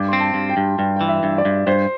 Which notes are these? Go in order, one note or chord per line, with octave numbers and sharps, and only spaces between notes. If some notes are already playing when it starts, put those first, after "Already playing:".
Already playing: G2 D6
C4 C6
A5
G2
G5
G2
G2 G5
E3 G5
E5
G2
D5
G2
G2 C5